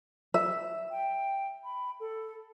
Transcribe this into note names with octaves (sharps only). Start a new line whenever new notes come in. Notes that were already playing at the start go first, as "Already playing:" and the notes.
E5
G5
B5
A4